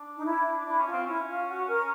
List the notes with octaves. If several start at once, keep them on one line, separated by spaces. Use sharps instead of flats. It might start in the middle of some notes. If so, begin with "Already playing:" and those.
Already playing: D4
D#4
E4
D4 E4
C#4
F4
C4
C#4 E4
F4
F#4
A#4